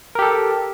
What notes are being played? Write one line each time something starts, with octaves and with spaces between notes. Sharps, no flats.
G4 A4 A#4